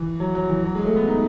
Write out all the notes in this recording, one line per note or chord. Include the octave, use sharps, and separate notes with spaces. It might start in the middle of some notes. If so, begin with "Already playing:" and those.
Already playing: E3
F#3
F#3
E3
F#3
G#3
A3
B3
D#4